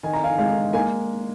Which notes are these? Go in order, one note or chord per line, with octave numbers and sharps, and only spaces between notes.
D#3 G#5
A#5
F5 G#5
G#3 F5 G#5
A#3 F5 G#5